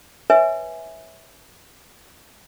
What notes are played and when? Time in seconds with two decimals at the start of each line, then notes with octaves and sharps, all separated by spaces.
0.30 B4 C#5 E5 G#5